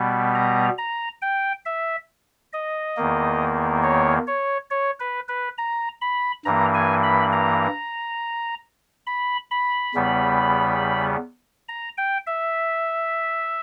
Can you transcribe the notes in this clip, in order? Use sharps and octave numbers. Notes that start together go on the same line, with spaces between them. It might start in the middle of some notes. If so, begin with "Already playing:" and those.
Already playing: B2 G3 B3
A#5
A#5
G5
E5
D#5
E2 D#3 A#3
C#5
C#5
C#5
B4
B4
A#5
B5
G2 E3 A#3 A#5
G#5
B5
A#5
B5
B5
E2 C#3 G3 B3
A#5
G5
E5